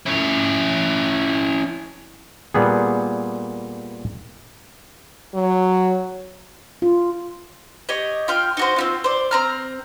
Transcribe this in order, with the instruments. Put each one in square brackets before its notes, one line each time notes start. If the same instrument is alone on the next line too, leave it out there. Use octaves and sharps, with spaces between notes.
[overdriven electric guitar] C#4 E4
[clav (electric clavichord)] A#2 G3 B3 G#4
[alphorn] F#3
[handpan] F4
[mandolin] G4 C#5 D#5
F4 G5 F6
D#4 F#4 C5
C4 C#4 F4
C5 D5
C4 A#5 F6